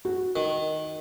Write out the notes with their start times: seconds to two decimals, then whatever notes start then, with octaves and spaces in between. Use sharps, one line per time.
0.05 F#4
0.36 D#3